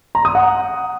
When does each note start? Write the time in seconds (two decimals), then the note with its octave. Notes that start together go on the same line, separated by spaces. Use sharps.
0.15 A#5
0.25 D#6
0.35 F#5